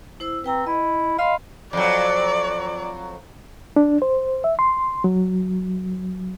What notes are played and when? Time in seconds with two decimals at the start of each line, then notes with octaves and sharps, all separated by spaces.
0.20 E4 C5 E6
0.44 C4 B4 G5 A#5
0.67 E4 D#5
1.19 D#5 F5 B5 C6
1.73 F2 F#3 D5
3.76 D4
4.02 C5
4.44 E5
4.59 C6
5.04 F#3